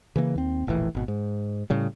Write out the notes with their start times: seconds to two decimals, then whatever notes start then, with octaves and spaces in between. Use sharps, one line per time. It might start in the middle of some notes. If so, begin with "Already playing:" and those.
0.16 C#3 E3 A#3
0.36 D#2 C4
0.67 E1 A#1 A2 E3
0.95 G#1 B2
1.08 G#2
1.70 A2 C#3 G3